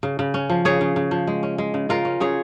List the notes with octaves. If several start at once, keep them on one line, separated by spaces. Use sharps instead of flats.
C#3
C#3
C#4
F3
C#3 G#4 C#5
C#3
C#3
F3
G#3
C#4
G#3
C#3
C#3 F4 A#4
C#4
C#3 G#4 C#5